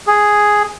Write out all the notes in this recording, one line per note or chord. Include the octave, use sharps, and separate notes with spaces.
G#4